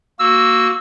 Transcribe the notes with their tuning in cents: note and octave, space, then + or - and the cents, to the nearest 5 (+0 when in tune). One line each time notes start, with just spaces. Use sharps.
A#3 +0 F#4 +0 E6 +0